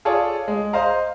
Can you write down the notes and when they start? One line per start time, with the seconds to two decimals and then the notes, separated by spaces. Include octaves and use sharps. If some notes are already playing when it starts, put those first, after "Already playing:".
0.05 F4 G#4 A4 C#5 D5
0.48 G#3
0.73 C5 D#5 F5 A#5